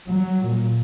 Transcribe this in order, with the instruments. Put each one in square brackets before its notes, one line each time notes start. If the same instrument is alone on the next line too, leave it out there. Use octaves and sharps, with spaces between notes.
[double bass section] F#3
A#2